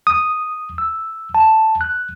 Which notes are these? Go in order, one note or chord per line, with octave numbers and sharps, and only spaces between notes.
D#6
E6
A5
F#6